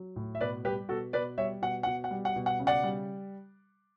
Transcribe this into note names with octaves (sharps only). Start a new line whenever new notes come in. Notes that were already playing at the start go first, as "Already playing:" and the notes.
Already playing: F#3
A2
E5
B2 B4 D5
G3 G4 B4
B2 F#4 A4
B2 B4 D5
G3 C#5 E5
B2 F#5
B2 F#5
F#5
G3
F#5
B2
F#5
C#3
D5 F#5
G3